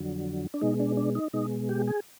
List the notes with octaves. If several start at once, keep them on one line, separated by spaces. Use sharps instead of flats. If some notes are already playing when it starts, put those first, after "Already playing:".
Already playing: F2 D3 F#3
D4
B2 G#3 D#4
D4
D4
D#4
B2 G#3 D#4
G4
G#4